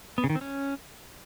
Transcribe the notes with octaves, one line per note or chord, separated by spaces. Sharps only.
B3
C#3
D#3
C4
C#4